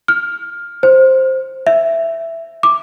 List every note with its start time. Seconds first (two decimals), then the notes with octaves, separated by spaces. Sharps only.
0.08 F6
0.83 C5
1.67 E5
2.63 D6